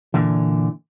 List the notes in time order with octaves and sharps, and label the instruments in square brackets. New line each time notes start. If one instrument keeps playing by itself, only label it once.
[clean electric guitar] A#2 D3 E3